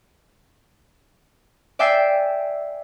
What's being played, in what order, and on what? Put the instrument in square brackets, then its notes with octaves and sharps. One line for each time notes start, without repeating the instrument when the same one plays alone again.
[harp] D5 E5 G5 G#5 E6 C7